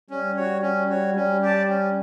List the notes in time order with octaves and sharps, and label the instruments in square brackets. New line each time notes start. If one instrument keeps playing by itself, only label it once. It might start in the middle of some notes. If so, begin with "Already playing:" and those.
[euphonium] G3 [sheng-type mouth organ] C#4
[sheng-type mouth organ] F#4 C#5
C#4
F#4 C#5
[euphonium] G3 [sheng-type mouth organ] C#4
[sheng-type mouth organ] G4 D5 A5
C#4